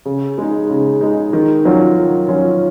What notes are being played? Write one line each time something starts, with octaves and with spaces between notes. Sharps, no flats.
C#3
G#3 D#4
C#3
G#3 D#4
D#3
F#3 C#4 F4
D#3
F#3 C#4 F4